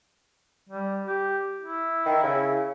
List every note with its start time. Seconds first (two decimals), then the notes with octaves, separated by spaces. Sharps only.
0.69 G3
1.07 G4
1.61 E4
2.05 D#3
2.23 C#3